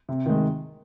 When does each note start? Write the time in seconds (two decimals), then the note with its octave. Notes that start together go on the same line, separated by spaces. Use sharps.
0.09 C3
0.26 D#3 G#3